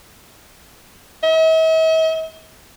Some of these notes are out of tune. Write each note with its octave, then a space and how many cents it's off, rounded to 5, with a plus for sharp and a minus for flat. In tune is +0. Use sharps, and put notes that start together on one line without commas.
E5 -45